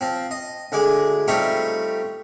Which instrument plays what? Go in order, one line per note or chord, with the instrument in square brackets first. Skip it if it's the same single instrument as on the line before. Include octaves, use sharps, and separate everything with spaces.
[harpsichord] F3 C4
D#5
D2 G#3 G#4 D6
G3 A3 C4 D#4 F4 C#5